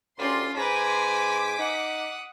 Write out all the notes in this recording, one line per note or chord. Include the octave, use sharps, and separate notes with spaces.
D2 C#4 F4 G4 A#4 D5 C6
G#2 B4 C5 G#5 A#5 D6 B6
D#4 F#5 D#6